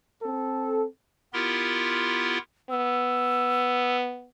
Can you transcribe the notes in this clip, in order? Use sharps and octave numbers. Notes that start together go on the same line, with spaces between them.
C4 A4
B3 E4 F4 G4 A#4 C6
B3 E6